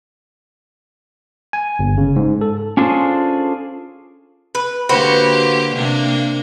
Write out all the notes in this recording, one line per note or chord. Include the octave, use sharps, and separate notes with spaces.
G#5
G1
C#3
G#2
A4
C#4 D4 F4 G#4 A4 C5
B4
D3 A#3 F#4 G4 B4 C5
C3 A#3 D4